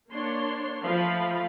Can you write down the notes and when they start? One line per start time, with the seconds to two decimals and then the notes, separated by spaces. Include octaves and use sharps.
0.10 A#3 D4 C#5 C6
0.82 F3 A3 F5 B5